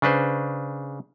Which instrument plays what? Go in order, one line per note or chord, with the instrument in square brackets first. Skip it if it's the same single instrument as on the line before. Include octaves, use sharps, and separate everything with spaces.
[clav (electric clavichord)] C#3 D4 B4 C5